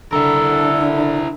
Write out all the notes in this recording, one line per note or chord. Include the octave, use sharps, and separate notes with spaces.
D3 D4 E4 A4 A#4